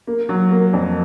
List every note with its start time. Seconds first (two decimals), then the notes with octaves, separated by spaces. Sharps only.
0.07 A#3
0.29 F#3
0.51 A#3
0.73 F2